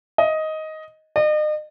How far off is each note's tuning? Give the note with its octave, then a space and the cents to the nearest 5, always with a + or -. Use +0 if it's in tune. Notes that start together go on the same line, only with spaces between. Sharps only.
D#5 +10
D#5 -40